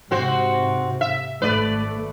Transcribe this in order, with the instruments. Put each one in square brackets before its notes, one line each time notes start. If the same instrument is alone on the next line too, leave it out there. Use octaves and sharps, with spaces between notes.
[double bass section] G#2 C3 [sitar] C4 F#4 C5
[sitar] E5
[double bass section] G#1 A3 [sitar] B4 D5